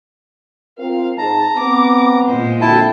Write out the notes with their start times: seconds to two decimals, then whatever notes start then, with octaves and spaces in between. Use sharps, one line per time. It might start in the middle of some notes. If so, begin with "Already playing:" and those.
0.79 C4 F4 A#4 F5
1.18 G#2 A5 A#5
1.57 B3 C4 D6
2.25 A#2 G#3 C5
2.61 F2 D3 E4 F#4 G5 A5